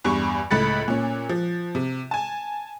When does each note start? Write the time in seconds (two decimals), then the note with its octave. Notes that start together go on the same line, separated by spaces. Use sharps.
0.04 E2 G2 G3 C#6
0.51 C#2 A2 B5 F#6 A6 C#7
0.88 A#2 C#4
1.29 F3
1.75 C3
2.11 G#5 A5